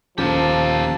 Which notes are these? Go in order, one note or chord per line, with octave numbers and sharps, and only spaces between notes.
D#1 D#2 F3 C#4 G4 A#4 A5